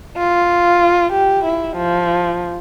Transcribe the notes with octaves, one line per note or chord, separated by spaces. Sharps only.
F4
G4
E4
F3